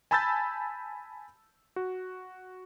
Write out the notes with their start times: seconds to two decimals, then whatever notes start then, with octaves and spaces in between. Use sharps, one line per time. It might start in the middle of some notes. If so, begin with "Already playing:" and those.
0.11 G#5 A5 B5 E6 G6 A6
1.76 F#4